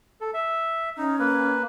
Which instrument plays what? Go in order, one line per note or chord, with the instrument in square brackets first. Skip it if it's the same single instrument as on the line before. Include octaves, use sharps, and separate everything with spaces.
[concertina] A4
E5
[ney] C#4 [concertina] D#4
[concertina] A#3 B4